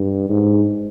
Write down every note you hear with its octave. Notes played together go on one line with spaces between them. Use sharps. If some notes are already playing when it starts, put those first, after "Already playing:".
Already playing: G2
G#2